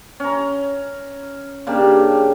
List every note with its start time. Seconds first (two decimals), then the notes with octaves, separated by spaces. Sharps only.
0.20 C#4 A#5
1.67 C#3 A#3 D4 G4